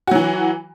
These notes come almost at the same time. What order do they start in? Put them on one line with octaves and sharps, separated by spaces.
F#4 F#3 E3